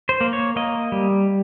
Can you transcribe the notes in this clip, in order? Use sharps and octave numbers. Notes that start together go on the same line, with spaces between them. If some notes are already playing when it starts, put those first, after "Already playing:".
C5
A#3
C#5
A#3 D#5
G3